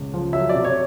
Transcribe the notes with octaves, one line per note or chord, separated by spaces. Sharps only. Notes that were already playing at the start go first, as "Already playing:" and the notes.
Already playing: C#2
F3
F#3 E5
C3 D5
C#5